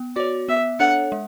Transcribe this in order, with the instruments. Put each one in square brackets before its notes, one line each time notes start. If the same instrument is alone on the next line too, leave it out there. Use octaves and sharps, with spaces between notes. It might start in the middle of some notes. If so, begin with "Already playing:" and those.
Already playing: [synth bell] B3
[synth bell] F#4 C#5 [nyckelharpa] D5
[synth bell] B3 [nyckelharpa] E5
[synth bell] D4 A4 C#5 [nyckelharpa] F#5
[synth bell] G#3